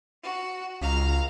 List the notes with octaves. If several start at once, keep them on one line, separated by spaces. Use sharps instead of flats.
F#4
C#2 F5 A#5